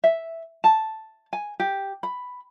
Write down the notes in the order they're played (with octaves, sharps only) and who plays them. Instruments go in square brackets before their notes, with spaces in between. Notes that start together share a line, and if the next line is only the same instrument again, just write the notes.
[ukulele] E5
A5
G#5
G4
B5